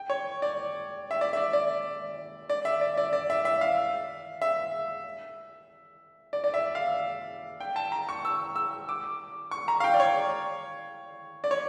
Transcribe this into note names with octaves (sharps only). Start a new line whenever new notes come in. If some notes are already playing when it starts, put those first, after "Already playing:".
Already playing: G5
C#5
D5
E5
D5
E5
D5
D5
D5
E5
D5
D5
D5
E5
E5
F5
E5
D5
D5
E5
F5
G5
A5
A#5
C#6
E6
E6
D6
C#6
A#5
F5
G5
D5
C#5
D5
C#5